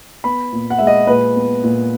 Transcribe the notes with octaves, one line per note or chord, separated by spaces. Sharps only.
B3 B5
A#2
F#5
G#3 E5
D#5
A#2 B4
B3
A#2